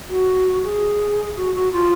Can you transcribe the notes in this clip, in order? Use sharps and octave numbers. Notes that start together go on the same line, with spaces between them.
F#4
G#4
F#4
F#4
F4